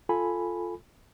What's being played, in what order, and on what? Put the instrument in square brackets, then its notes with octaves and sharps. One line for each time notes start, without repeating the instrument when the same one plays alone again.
[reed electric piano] F4 A4 G#5 B5